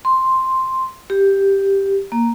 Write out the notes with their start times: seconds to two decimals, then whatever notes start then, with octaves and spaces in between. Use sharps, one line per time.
0.05 C6
1.10 G4
2.12 A#3